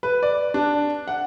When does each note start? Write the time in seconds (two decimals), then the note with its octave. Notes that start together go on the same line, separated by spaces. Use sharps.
0.03 B4
0.23 D5
0.54 D4
1.07 F#5